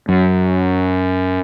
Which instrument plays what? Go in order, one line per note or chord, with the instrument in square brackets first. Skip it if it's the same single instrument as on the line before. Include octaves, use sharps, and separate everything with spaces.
[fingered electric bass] F#2